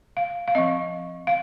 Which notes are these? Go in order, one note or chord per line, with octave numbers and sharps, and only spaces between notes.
F5
F5
F3 C4 D#5
F5